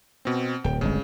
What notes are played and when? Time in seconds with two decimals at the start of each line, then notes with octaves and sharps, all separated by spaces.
0.25 B2 C4
0.64 D1 G5
0.81 D1 G1 C#3 G#3